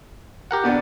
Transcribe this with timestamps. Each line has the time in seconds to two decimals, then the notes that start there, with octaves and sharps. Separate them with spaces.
0.51 G4 A#4 F#5
0.64 B2 B3 D4